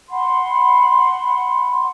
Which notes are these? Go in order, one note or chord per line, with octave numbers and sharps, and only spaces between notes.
F#5 B5 C6